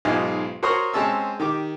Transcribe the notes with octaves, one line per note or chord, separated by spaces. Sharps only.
B1 G#2 F4 G4 D#5 G#5
F#4 A#4 C5 C#5 C6 D#6
G#3 C4 C#4 A5 E6
D#3 G4 D6